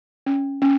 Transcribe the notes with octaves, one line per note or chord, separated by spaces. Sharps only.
C#4
C#4